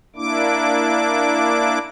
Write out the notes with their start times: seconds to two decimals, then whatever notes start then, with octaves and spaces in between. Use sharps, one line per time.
0.16 A#3 D4 E4 D6